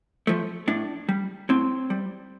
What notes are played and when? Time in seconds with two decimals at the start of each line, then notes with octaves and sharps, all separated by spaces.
0.27 F3 A3
0.68 A2 D4
1.09 G3
1.49 A2 C4
1.90 G3